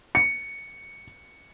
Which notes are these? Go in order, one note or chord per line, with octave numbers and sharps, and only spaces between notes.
C#7